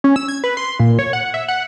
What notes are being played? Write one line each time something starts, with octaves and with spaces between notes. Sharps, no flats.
C#4
E6
G#6
B4
C6
A#2
C#5
F#5
E5
F#5